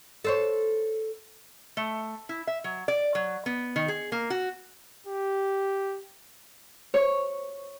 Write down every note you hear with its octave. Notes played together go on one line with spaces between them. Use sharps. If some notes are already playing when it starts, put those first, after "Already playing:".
A4 C5 C#5
A3
E4
E5
F#3
D5
F#3
B3
D#3
G#4
A#3
F#4
G4
C#5